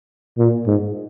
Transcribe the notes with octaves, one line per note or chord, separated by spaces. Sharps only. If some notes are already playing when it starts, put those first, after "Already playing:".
A#2
G#2